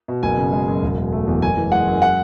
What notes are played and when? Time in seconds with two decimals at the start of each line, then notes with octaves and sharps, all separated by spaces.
0.08 B2
0.23 F#1 G#5
0.38 C#3
0.52 G#3
0.68 F#2
0.82 E1
0.98 B2
1.12 A3
1.27 E2
1.42 F#1 G#5
1.57 E3
1.71 G#3 F#5
1.87 F#2
2.02 F#5